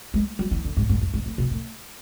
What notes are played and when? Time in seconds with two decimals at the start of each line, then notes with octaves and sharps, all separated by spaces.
0.14 G#3
0.39 F#3
0.51 E3
0.65 D3
0.77 G#2
0.89 G#2
1.01 F#2
1.14 G#2
1.26 A2
1.38 B2
1.51 A2